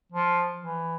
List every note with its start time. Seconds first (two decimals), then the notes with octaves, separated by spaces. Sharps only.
0.12 F3
0.61 E3